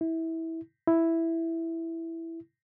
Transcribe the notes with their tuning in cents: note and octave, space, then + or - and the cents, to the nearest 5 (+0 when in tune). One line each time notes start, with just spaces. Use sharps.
E4 -20
E4 +0